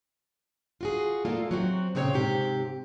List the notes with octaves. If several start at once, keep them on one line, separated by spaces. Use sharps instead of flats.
F4 F#4 G#4
A3 A#3 F4 A4 D5
F#3 C4 F#4
A#2 C#3 C4 G4 C#5 G5
G#2 C3 G4